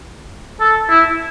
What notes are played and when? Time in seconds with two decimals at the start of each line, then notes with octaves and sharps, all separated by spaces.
0.60 A4
0.90 E4